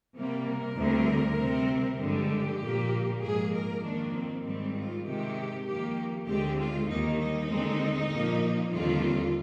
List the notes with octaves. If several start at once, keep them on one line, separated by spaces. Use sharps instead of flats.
C3 G3 A#3
A#4
D2 D3 G3 C4
C3 G3 C4
G2 D3 F3 G#3 G4
A#2 F3 A#3
G#2 F3 A#3 G#4
A#4
F2 D#3 A#3 D4
C4
G#2 D#3 G3 C4
F4
C3 D#3 G#3 G4
F2 D#3 A#3 G4
D2 D3 G#3 C4 G4
F4
D#2 D#3 G3 A#3 D#4
D#4
D#2 D3 G#3 C4
A#2 F3 A#3
D#2 D3 G3 C4 F4